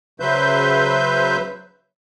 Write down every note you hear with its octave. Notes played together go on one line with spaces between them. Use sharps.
C#3 F#3 B4 C5 E5 G6